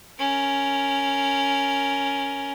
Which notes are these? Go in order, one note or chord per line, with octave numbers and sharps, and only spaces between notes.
C#4 A#4